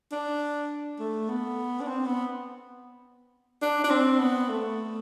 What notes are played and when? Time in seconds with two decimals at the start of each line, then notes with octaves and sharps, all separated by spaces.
0.12 D4
0.99 A3
1.29 B3
1.81 D4
1.87 C4
2.06 B3
3.62 D4
3.84 D4
3.90 C4
4.19 B3
4.49 A3